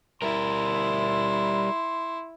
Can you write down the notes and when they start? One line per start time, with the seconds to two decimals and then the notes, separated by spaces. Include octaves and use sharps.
0.22 G3 E4 A#4 C6